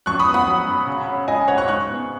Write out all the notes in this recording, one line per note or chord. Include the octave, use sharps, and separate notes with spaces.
F#2 C#6 F#6
B5 D#6
B3
F#5 B5
F#3
F#2
C#3
C#4
G#3 D#5 G#5
C#3 C#5 F#5
C#6 F#6
G#2 C#6 F#6
B3